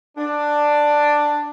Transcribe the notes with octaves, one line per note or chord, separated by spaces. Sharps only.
D4